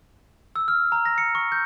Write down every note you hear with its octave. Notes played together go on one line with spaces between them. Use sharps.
E6
F6
A#5
A#6
C#7
C#6
G6